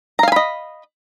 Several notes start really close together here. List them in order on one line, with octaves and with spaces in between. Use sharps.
A#5 F5 G#5 B5 D#5